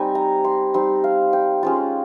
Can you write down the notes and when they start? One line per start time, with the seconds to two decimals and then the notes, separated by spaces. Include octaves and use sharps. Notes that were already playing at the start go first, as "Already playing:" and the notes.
Already playing: G3 C4 D#4 G#5
0.15 A#5
0.44 C6
0.74 G3 C4 D#4 C6
1.04 F5
1.33 G5
1.63 G#3 C#4 F4